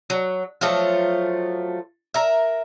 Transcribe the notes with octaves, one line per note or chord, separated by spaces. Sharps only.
F#3
F3 F#3 A3 F4
A#4 E5